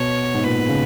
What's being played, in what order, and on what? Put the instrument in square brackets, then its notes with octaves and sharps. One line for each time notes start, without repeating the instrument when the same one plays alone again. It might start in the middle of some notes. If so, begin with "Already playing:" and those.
Already playing: [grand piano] B2 [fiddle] C#5
[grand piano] G#2
[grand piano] A#2 [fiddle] B4
[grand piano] C#3